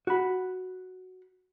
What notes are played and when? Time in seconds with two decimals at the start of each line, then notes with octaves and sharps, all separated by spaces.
0.07 F#4 B5